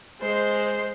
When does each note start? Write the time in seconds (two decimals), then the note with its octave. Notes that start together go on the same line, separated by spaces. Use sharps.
0.21 G#3 C5